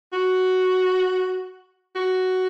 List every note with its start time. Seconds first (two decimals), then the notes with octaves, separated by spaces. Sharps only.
0.13 F#4
1.95 F#4